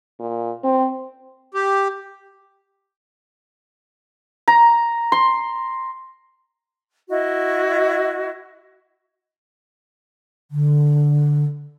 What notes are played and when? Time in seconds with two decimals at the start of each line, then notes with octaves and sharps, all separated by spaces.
0.20 A#2
0.64 C4
1.54 G4
4.48 A#5
5.12 C6
7.08 E4 F#4 D#5
10.51 D3